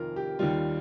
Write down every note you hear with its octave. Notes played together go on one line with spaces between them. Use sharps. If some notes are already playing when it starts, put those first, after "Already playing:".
Already playing: F1 F2 D#3 F4 A#4
G4
D#2 D#3 G3 F4